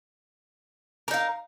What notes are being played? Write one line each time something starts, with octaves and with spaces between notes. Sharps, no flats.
D#4 A#4 F5